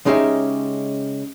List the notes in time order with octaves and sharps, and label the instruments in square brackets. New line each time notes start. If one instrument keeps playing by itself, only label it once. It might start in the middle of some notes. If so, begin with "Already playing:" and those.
[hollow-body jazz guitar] C#3 G#3 C#4 D#4 G4 E5